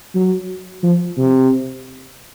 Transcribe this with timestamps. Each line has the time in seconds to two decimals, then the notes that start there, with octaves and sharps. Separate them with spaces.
0.15 F#3
0.83 F3
1.17 C3